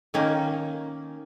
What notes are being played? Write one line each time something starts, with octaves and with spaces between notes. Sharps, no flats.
D#3 A#3 C#4